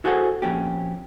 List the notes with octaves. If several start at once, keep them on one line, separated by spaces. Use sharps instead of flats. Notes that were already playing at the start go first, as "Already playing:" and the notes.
E4 F#4 G#4 A4 C5 F#5
F2 A#2 C#4 G4